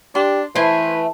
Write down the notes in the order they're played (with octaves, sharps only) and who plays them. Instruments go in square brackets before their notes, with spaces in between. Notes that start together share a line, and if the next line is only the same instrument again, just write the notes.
[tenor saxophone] D4 [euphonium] G4 [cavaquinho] C6
[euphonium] E3 [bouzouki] A3 [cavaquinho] E4 C5 C6 [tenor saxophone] B4